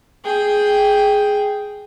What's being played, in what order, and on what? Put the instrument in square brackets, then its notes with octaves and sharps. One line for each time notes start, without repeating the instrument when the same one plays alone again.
[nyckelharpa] G#4 G5